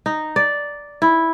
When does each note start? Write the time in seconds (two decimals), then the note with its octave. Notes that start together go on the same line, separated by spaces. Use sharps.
0.06 D#4
0.36 D5
1.02 E4